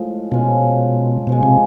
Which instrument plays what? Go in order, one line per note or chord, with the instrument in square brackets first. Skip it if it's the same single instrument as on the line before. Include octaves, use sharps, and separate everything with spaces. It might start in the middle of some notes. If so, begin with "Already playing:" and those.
Already playing: [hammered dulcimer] A2 F3 G#3
[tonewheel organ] B2 [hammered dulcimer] F3 G#3 C#4
[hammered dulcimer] G#2 F3 G#3 [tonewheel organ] B2
[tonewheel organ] C3